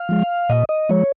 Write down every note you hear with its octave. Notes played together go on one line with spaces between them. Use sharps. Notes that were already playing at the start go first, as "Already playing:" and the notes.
Already playing: F5
F3 G#3
A#2 D#5
D#5
F3 G#3 C#5